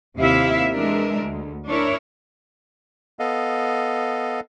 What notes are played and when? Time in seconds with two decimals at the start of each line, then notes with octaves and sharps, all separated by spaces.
0.17 D#2 C3 E4 E5 F5
0.72 E3 G#3 D4 A#4 E5
1.20 D2
1.67 D4 E4 A#4 C#5
3.19 B3 A4 D#5 F5